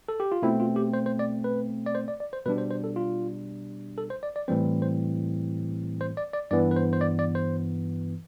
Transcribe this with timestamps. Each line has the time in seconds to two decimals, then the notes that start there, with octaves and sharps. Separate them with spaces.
0.08 A4
0.20 G4
0.32 F4
0.42 B2 A3 C4 E4
0.60 F4
0.76 G4
0.93 C5
1.06 C5
1.19 D5
1.44 B4
1.86 D5
1.95 C5
2.08 D5
2.20 D5
2.33 C5
2.45 B2 G3 D4 B4
2.58 C5
2.71 C5
2.84 A4
2.96 F4
3.98 A4
4.10 C5
4.23 D5
4.36 D5
4.48 A2 E3 G3 C4 C5
4.82 C5
6.01 C5
6.17 D5
6.33 D5
6.51 G2 E3 B3 D5
6.71 B4
6.76 C5
6.93 C5
7.01 D5
7.19 D5
7.35 C5